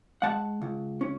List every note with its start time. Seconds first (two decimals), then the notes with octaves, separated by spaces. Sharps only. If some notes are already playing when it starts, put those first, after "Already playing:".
0.22 G#3 F#5 A5
0.62 C#2
1.01 C#4